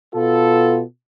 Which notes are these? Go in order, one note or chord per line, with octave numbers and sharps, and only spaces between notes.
B2 B3 F4 A4